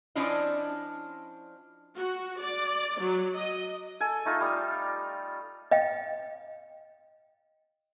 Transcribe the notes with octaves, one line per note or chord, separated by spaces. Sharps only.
F3 C#4 D4 E4 F4 D#5
F#4
D5
F#3
D#5
A4 G#5
A3 D#4 F4
G3 D#6
D#5 F5 G5